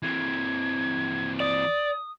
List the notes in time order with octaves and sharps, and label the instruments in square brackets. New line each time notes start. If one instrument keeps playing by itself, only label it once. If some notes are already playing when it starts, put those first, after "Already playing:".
[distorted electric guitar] E3 C4 [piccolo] G#6
[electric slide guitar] D5 [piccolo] D#6